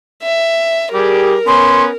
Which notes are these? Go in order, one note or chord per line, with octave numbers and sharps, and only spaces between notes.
E5
G3 G4 G#4 A#4
B3 C#4 C6